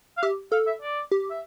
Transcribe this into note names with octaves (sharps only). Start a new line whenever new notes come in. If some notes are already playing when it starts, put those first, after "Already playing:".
F5
G4 E5
A4 F5
E5
D5
G4
E5